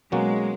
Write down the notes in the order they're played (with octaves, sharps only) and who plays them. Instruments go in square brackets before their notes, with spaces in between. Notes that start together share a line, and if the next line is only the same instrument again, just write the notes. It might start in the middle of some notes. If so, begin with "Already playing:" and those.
[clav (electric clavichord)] B2 F#3 A#3 C#4 F#4 [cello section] G#3